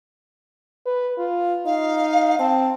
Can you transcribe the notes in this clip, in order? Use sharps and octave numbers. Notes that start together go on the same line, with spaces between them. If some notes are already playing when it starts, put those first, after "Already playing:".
B4
F4
D#4 F5
C4 A5